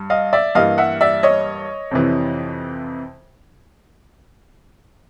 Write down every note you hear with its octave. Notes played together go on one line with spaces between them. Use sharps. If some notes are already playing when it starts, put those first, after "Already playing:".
Already playing: G2
D#5 F5
D5 E5
G2 E3 G3 A#3 D#5 F5
E5 F#5
D5 E5
C#5 D#5
F2 C3 E3